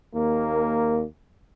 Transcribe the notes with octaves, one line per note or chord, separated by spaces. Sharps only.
D#2 A#3